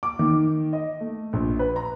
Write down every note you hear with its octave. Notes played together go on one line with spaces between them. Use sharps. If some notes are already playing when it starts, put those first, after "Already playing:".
D6
D#3
D#5
A3
A#1
B4
A#5